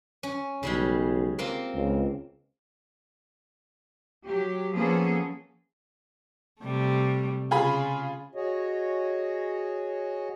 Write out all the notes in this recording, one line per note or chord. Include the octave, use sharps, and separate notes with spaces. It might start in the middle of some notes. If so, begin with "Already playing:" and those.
C#4
B1 C#3 G3 G#3
A#3 C4 F4
C#2
F#3 G4
F3 A#3 B3 C#4 G#4 A4
C3 G3 A3
C#3 F4 G#4 B5
F#4 G#4 C#5 D#5